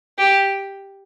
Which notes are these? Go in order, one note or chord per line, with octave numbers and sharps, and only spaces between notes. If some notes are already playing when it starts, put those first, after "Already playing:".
G4